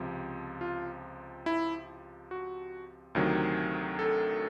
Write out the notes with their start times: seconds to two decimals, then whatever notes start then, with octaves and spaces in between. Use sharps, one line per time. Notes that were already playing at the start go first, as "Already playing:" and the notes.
Already playing: C#2 C3 F3
0.61 F4
1.46 E4
2.31 F#4
3.15 D2 C3 D#3 F#3
3.99 A4